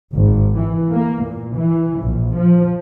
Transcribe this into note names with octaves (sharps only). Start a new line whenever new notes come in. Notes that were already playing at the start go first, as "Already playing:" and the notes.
G#1
E3
A#3
A#2
E3
A#1
F3